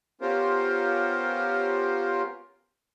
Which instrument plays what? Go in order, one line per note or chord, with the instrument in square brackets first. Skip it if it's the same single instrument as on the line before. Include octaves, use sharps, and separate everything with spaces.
[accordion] B3 C#4 F4 G4 A#4 C5